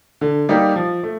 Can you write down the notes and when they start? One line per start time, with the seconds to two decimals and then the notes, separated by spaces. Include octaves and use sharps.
0.21 D3
0.49 G3 A#3 D#4 G4
0.76 F3
1.03 A3